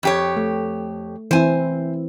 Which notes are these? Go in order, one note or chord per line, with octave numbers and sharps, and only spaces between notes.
F2 G4 C#5
A3
E3 C4 E4 C5 G#5